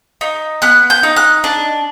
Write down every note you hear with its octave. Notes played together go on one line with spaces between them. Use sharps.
D#4
B3 F#6
G6
D#4
F#6
D4